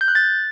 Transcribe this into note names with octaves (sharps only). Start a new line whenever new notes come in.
G6
F#6
A6